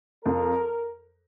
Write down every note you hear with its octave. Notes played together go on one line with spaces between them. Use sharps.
F2 A#4